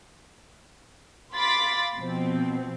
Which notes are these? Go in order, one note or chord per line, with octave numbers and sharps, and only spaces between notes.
F5 B5 C6 D6 A6 B6
B2 F3 C4